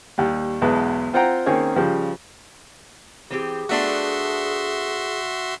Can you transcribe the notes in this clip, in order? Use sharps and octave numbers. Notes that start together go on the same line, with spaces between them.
D#2 G3
B1 E2 G#3 B4 A5
C4 F4 C5 F#5 G5 A#5
D#3 A#3 C4 C#4 G#4 C#5
C#3 F3 G3
E3 C4 G4 G#4
A3 B3 D4 F#4 E5 C6